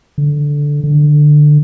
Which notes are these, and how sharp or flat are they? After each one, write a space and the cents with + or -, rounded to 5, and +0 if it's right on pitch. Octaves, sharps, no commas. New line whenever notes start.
D3 -10
D3 +15